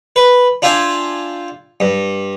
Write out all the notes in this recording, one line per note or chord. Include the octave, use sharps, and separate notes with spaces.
B4
D4 F4 E5 G5 G#5
G2